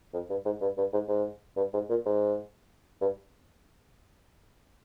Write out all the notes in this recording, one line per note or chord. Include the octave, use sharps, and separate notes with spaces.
F2
G2
G#2
G2
G2
G#2
G#2
G2
G#2
A#2
G#2
G2